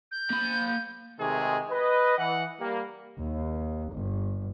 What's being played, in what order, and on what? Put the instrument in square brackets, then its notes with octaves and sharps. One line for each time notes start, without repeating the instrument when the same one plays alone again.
[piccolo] G6
[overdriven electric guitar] A#3 B5
[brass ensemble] C3 D#3 G#3 A3 G#4
B4 D#5
E3 F#5
G3 A#3
[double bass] D#2
G1